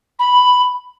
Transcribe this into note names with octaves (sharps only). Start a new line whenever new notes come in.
B5